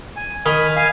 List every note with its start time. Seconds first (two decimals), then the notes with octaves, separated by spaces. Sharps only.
0.16 G#5
0.46 D#3 G#5 B5 F6
0.76 F5 G#5